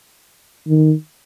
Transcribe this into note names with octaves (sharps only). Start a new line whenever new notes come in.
D#3